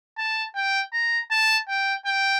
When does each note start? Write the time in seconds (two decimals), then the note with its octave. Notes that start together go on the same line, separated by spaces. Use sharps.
0.18 A5
0.55 G5
0.93 A#5
1.31 A5
1.69 G5
2.06 G5